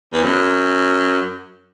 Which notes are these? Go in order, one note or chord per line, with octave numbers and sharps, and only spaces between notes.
E2
F#2